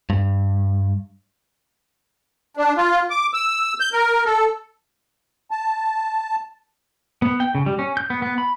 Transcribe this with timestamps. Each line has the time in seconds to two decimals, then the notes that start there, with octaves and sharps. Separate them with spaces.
0.10 G2
2.57 D4
2.77 F4
3.10 D6
3.34 E6
3.80 G6
3.93 A#4
4.26 A4
5.51 A5
7.22 B3
7.40 G5
7.55 C#3
7.66 G3
7.79 C#4
7.97 G6
8.10 B3
8.22 B3
8.38 B5